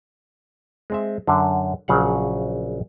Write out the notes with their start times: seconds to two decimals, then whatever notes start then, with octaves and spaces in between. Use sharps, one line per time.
0.90 G#3 C4 E5
1.27 F#2 D3
1.88 A#1 C#3 F#3 F5 F#5